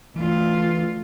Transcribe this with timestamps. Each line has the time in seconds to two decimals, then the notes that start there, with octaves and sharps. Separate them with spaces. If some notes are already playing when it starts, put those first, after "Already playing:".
0.16 D2 E3 F4